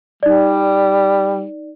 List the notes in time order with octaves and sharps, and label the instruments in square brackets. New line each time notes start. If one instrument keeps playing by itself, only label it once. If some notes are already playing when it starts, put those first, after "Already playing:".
[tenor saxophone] G3 [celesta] D#4 D5